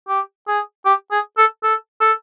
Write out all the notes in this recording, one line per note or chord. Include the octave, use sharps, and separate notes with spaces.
G4
G#4
G4
G#4
A4
A4
A4